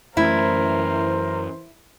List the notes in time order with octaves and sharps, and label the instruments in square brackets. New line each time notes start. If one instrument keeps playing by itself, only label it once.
[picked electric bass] F#2 A3 C#4 [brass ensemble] E3 C5 [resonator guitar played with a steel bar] E4 [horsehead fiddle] A#4